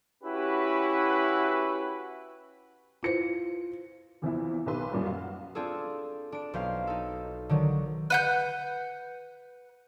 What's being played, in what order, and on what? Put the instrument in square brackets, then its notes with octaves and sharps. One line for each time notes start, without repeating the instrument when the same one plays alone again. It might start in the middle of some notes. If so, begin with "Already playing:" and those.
[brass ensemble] C#4 E4 F#4 G4 B4
[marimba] E4 B4 C5 [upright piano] F4 C#7
[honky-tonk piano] E2 C3 E3 F3 B3 E4
B1 D#3 G4 B4 C6 E6
F#2 A#2 F#3 G3
F#4 F5
[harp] C4 D4 F4 G#4 A4
D4 D7
B1 C5 F5 C7
D#4 A4
D3 D#3 F#3
[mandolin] B4 F#5 G6